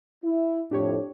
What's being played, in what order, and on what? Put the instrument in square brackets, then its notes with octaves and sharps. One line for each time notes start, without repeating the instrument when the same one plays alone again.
[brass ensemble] E4
[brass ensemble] F2 A2 [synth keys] D4 G4 C#5